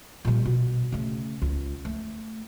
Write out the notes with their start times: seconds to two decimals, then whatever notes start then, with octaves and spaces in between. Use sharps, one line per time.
0.25 A#2 G3
0.45 B2
0.92 C#3 A3
1.42 C#2
1.85 A3